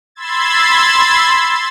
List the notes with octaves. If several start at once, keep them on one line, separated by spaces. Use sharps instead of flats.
B5 C6 E6 G#6 A6